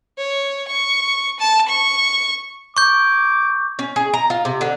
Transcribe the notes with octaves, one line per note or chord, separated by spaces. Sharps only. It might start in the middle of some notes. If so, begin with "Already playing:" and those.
C#5
C#6
A5
C#6
C#6 D6 G6
C#4
G#4
A#5
F4
C3
D3